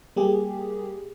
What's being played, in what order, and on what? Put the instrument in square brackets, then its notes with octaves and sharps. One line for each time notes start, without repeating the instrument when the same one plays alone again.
[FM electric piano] G3 A#3 G4 G#4